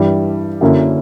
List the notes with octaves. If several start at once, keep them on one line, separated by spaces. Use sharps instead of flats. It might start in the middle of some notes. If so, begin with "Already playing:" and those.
Already playing: G2 E3 G3
F#2 D3 A#3 C#4 E4